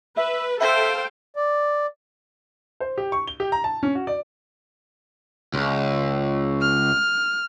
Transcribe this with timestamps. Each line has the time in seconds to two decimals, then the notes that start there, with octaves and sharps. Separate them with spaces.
0.17 B4 E5
0.61 A4 C5 E5 F5 G5
1.36 D5
2.80 C5
2.98 G4
3.12 C#6
3.27 G7
3.40 G4
3.52 A#5
3.64 A5
3.83 C#4
3.95 F#4
4.07 D5
5.54 C#2
6.62 F6